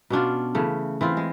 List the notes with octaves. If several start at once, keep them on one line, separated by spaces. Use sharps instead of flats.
B2 C#4 D4 F4
C#3 E3 A3
E3 C4 F4
G#3